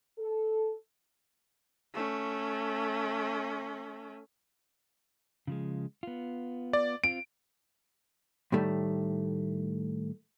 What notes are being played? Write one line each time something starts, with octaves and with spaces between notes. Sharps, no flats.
A4
A3 C#4
C#3 F3 G#3
B3 F4
D5
C4 F4 D7
A2 D#3 G3 A3